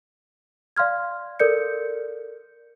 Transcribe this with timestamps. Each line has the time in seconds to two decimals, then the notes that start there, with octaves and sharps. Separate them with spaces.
0.77 D5 F5 C6 F6 G#6
1.40 A4 A#4 D5 G6 C#7